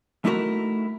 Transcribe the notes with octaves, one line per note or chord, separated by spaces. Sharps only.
A3 D#4 E4 F#4 A4 A#4